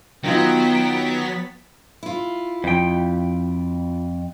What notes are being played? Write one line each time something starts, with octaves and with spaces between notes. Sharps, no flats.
D#3 F#3 B3 D#4 F4 G5 A6 B6
E4 F4
F2 G5